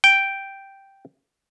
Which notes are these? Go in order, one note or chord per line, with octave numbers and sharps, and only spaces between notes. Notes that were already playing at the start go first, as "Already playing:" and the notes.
G5